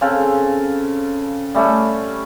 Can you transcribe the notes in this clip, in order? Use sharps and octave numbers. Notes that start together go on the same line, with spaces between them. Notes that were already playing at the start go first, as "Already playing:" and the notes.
C#3 C4 A4 F5
G3 A3 C#4